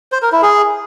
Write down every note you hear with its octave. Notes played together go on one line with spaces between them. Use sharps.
C5
A#4
E4
G#4